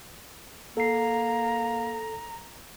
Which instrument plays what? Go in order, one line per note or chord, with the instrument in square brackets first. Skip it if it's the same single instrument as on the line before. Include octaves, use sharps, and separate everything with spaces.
[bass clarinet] A#3 [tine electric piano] A4 C7 [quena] A#5